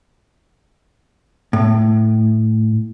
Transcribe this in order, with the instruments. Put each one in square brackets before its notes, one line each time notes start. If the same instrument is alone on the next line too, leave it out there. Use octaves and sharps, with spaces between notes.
[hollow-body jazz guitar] A2